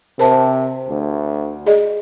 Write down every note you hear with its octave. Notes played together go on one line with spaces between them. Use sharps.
C3 A#4 C5 A5
D2
G#4 D5 D#5